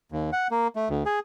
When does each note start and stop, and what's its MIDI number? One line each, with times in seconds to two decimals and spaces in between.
0.12 0.30 39
0.33 0.47 78
0.51 0.67 58
0.76 0.89 57
0.90 1.03 38
1.06 1.19 68